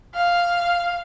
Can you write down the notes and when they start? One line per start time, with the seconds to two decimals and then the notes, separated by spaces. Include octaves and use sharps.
0.15 F5